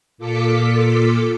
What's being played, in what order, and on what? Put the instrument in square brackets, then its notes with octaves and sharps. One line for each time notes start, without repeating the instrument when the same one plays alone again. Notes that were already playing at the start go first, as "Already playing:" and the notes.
[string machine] A#2 F4 A4 D6 B6 C#7